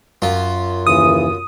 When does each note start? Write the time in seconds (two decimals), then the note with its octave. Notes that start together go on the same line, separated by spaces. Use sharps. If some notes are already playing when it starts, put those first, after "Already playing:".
0.22 F#2 F4
0.87 D#2 C#3 E3 D#6